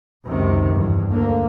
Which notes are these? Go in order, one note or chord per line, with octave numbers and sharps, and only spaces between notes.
C#2 F#2 C3 D#3
E2 G2
D2 D3 A#3